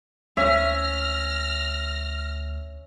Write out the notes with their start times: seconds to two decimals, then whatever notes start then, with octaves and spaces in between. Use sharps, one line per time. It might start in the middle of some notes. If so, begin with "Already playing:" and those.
0.37 D2 C#4 E5 F6 A#6